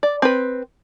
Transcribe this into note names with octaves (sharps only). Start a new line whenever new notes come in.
D5
C4 B4